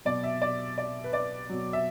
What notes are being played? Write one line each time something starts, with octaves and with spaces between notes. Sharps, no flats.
B2 F#3 D5
E5
D5
D5
B4
D5
B2 F#3
E5